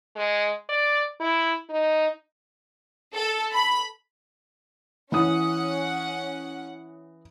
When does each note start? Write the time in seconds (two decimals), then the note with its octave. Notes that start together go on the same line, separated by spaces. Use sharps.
0.16 G#3
0.69 D5
1.20 E4
1.70 D#4
3.14 A4
3.53 B5
5.12 E3 C#4 F#5 D#6